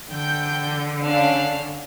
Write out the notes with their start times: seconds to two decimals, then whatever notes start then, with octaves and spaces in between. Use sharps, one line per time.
0.11 D3 G5 G6
1.04 C#4 D4 F5